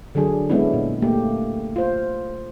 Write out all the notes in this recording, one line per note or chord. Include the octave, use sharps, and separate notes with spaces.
D3 F#3 D4 G#4
G#3 B3 C#4 D4 E4
A#2
A3 A#3 G4
F4 C5